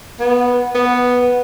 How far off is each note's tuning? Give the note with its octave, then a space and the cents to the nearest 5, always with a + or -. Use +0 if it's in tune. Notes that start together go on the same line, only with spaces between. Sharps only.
B3 -10
B3 -5